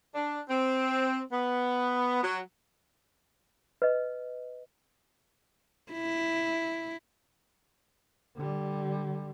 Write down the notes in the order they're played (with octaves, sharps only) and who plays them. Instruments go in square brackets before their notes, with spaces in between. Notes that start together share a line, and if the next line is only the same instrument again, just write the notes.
[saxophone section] D4
C4
B3
F#3
[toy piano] B4 D#5
[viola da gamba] E4
[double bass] D3 G3